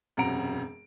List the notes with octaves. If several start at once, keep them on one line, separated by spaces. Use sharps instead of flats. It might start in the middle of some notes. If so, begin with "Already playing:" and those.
E1 F#2 C3 F#5 A#5 D7